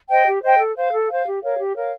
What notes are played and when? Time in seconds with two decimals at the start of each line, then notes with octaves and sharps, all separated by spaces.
0.10 C5 D#5 G5
0.26 G4
0.42 C5 D#5 G5
0.59 A4
0.76 C5 F5
0.92 A4
1.09 C5 F5
1.26 G4
1.43 A#4 C#5 F5
1.59 G4
1.76 A#4 C#5 F5